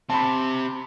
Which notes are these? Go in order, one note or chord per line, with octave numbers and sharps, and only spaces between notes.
C3 A5 B5